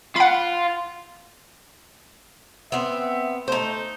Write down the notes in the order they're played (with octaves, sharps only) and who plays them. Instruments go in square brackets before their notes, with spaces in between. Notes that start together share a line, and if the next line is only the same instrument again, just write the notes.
[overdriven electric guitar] F4 [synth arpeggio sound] F#5 B5
[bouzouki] B3 C4 [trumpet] E5
[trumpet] A3 [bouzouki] D#4 C5